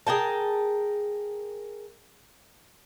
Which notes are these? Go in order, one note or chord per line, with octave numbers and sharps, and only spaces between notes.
G#4 A#4 G5 A5